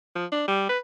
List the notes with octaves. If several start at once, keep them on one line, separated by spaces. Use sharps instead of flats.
F3
D4
G3
B4